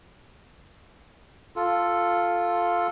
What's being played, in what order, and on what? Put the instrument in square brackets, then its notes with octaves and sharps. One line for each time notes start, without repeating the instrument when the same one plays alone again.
[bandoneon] F4 A4